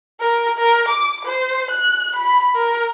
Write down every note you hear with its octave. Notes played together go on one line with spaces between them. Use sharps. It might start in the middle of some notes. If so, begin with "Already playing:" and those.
A#4
A#4
D6
C5
F#6
B5
A#4